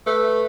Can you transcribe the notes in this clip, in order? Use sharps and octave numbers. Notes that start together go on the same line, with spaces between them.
A3 B4